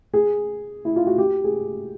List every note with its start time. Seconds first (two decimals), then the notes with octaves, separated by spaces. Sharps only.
0.14 G#4
0.85 E4
0.96 F4
1.07 F#4
1.18 G4
1.44 G#4